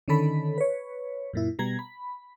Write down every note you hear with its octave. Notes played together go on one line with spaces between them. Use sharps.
D3 D#3 C#4 A4 B5
B4 C#5
F#2 A#2 E4
B2 G3 A#5 G#6
B5